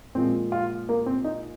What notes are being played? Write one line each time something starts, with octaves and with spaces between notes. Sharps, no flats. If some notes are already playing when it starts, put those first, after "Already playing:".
A#2 F3 G#3 C4
F4
A#3
C4
D#4